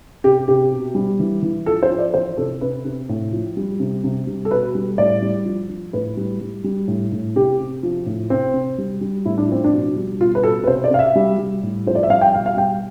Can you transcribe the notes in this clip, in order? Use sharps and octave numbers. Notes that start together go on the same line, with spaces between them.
C3 G4
C3 G4
B2
G3
E3
E3
F3 A4
C5
F3
D5
E3 C5
C3 A4
C3 B4
C3
A2
F3
G3
C3
C3
G3
A4
B2 B4
G3
A2 D5
G3
F3
F3
A2 B4
G3
G3
G3
A2
A2
C3 G4
C3
F3
A2
C3 C4
C3
G3
G3
A2 E4
D4
F3 C4
D4
B2
G3
B2 F4
B4
B2 A4
B4
C3 C5
D5
C3 F5
E5
G3
G3
A2
F3 C5
D5
E5
G3 F5
G5
B2 F5
F5
G3 G5